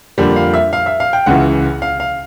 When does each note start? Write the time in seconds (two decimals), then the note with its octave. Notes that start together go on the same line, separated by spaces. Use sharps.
0.18 F2 D3 G3 A#3
0.36 F5
0.54 E5
0.73 F5
0.86 E5
1.00 F5
1.13 G5
1.26 C#2 C#3 E3 F#5
1.82 F5
2.00 F5